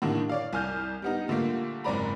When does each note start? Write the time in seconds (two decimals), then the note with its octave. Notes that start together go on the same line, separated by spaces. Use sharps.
0.02 A2 D3 D#3 G3 A#3 D4
0.29 C#5 D5 F5
0.53 C2 G#5 F6 G6
1.02 G3 B3 D#4
1.28 A#2 D3 G3 A3 A#3
1.84 F#1 G#2 C4 D5 A#5 B5